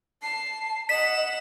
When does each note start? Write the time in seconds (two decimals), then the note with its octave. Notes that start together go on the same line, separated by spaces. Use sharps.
0.23 A5 C7
0.89 D#5 F#5 B6 E7